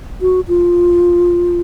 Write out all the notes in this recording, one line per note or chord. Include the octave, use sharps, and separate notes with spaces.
F#4
F4